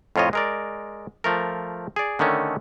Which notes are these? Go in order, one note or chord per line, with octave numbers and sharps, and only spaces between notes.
F2 A2 F4 C#5 D#5
G#3 A#4 D5
F3 A3 A#4
G#4 D5
D3 D#3 A3 C#4